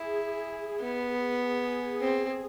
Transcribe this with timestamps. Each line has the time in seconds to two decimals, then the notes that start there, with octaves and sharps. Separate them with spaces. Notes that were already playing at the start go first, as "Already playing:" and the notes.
Already playing: E4 G#4
0.81 B3
1.41 G#4
2.02 C4